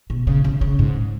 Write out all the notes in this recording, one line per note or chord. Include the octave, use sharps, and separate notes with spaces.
B2
C#3
C#3
C#3
G#2